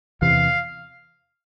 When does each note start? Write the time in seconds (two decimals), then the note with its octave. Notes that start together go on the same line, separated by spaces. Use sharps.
0.22 E2 C3 E3 F5